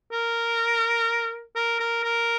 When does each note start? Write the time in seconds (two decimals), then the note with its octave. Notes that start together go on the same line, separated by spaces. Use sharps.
0.12 A#4
1.56 A#4
1.80 A#4
2.04 A#4